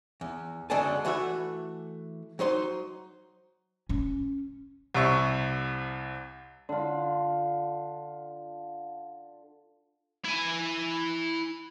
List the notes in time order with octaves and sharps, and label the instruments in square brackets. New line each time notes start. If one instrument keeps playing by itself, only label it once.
[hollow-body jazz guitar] E2
F#2 D3 G#3 D4 G#5 A5
E3 A3 F#4 E5
F#3 D#4 C5 C6
[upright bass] C#4
[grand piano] C2 C3 C#6 E6
[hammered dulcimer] D3 F4
[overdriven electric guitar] E4 G#5